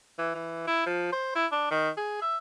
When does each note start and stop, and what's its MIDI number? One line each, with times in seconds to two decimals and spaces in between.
0.19 0.32 52
0.35 0.63 52
0.67 0.85 64
0.86 1.12 53
1.13 1.31 72
1.35 1.46 64
1.52 1.70 62
1.71 1.89 51
1.97 2.21 68
2.22 2.38 76